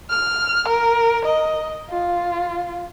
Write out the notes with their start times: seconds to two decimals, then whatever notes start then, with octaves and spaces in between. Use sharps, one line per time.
0.11 F6
0.68 A#4
1.26 D#5
1.90 F4